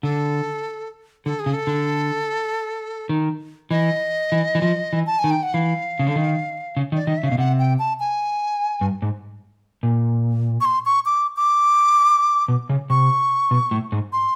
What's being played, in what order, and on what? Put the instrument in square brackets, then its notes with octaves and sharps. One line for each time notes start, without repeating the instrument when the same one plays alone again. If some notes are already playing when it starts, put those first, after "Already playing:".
[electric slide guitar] D3 [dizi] A4
[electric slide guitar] D3 [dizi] A4
[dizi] G#4
[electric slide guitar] C#3
[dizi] A4
[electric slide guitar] D3
D#3
[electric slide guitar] E3 [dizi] D#5
[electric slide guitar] E3
E3
F3
E3
[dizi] A5
G#5
[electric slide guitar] D#3
[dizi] G5
F#5
[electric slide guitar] E3 [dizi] F5
[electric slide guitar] C#3
D3
D#3
C#3
D#3
[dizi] D5
[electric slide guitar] D#3 [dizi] D#5
[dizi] E5
[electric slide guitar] C#3
[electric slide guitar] B2 [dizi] F5
[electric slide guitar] C3 [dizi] F#5
[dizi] G5
A5
G#5
[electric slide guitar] G2
G#2
A#2
[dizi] C#6
C6
C#6
D6
D6
[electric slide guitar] B2
C#3
[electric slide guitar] C3 [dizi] C#6
[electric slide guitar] B2
A2
G#2
[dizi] C6